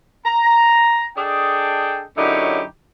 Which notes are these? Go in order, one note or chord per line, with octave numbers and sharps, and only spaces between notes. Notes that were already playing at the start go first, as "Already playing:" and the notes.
A#5
D4 G#4 A4 D#5 G5
F#2 D3 D#4 E4 G4 C#5